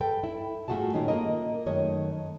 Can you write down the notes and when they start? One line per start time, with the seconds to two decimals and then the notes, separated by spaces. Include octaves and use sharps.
0.01 A4 B4 G5
0.23 E4
0.68 A2 A3 F4 F#4 G#4 A5
0.93 A#2 D#3 C#4 D#4 F4 A#4
1.08 A#3 F4 A#4 D#5
1.66 F#2 D#3 A3 C#5 D#5